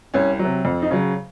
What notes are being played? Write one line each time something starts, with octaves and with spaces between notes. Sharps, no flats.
C2 C#4
C3 F#3
F2
D#4
C#3 F#3